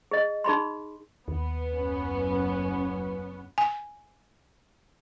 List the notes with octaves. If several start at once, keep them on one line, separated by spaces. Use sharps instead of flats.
G#4 D#5
D#4 G#4 B5 C6
D#2 B3
F#1 C#4
G#5